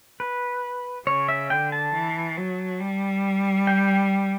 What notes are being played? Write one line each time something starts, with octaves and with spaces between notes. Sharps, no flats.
B4
C#3 C#5
E5
D3 G5
A5
E3
F#3
G3
G5